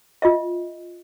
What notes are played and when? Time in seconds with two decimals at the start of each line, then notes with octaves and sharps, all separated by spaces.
0.22 F4 D#5 E5